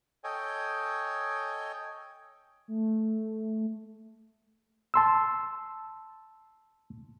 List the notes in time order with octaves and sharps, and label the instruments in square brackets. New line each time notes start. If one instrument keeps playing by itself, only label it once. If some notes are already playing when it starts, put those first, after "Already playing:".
[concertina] A4 C#5 D#5 G5 G#5
[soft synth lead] A3
[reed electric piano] A5 C6 E6